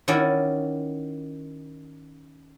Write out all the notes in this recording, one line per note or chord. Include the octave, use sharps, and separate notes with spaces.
D#3 C#4 E4 F#4 D5